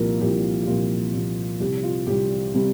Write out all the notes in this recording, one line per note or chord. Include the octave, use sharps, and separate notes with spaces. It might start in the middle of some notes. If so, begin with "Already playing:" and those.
Already playing: C2 A#2 F3 A#4
C2 A#2 F3 G4
G4
C2 A#2 F3 F4
C2 A#2 F3
C2 C3 G3 G4
F4
C2 C3 G3 G4
C3 G3